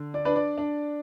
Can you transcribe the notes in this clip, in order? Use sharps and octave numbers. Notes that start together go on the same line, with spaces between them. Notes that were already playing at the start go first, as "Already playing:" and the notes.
Already playing: D3
D5
D4 B4
D5
D4